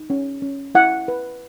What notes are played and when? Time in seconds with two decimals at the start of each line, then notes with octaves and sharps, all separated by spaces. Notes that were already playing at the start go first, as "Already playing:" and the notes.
Already playing: D#4
0.10 C#4
0.42 C#4
0.75 E4 F#5
1.08 B4